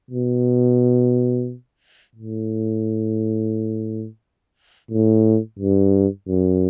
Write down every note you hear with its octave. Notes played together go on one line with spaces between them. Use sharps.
B2
A2
A2
G2
F#2